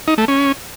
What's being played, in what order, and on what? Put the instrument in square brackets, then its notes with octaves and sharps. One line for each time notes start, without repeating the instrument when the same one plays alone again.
[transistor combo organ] D#4
A3
C#4